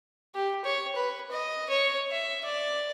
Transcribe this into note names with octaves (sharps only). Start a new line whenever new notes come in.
G4
C#5
B4
D#5
C#5
E5
D5